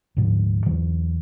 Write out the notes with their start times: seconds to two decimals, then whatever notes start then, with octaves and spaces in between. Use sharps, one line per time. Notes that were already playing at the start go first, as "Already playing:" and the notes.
0.17 D2 G#2 F3
0.66 E2 E3 F#3